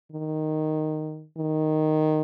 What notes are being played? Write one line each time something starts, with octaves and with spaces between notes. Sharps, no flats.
D#3
D#3